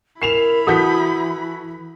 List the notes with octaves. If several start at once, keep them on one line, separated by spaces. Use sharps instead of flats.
E4 A#4 B5 C7 E7 F7
E3 F#4 A4 D#6 G6 B6